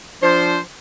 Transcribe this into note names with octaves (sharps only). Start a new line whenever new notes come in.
F3 D4 C5